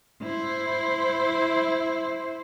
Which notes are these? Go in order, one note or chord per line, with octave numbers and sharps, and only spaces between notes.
E4 C5